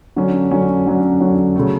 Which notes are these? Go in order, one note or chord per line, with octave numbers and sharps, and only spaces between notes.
D3 F#3 C#4
D3 F#3 C#4
D3 F#3 C#4
D3 F#3 C#4
C#3 F#3 A3